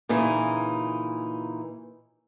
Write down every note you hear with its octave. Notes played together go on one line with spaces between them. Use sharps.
A#2 C#3 E3 D#4